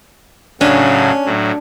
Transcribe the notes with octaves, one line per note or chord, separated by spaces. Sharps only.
A2 C#3 F#3 C#4 D4
A2 F#3